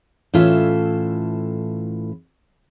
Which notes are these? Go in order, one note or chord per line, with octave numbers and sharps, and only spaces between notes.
A2 E3 C#4 F4 A4 E5